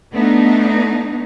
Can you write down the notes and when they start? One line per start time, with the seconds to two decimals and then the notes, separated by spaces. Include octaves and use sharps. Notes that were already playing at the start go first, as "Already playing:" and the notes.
0.14 A3 B3 D4 D#4